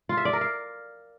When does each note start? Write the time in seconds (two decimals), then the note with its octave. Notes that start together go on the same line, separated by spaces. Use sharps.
0.09 F4
0.17 E5
0.25 D5
0.33 A#4
0.41 F5